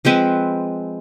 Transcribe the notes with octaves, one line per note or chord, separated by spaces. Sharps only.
F3 G#3 C4 B4